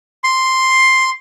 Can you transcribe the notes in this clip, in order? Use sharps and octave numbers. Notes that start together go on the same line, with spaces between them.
C6